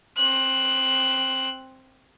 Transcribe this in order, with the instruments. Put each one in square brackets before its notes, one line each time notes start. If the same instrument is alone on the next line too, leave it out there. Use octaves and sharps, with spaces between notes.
[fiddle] C4 F#6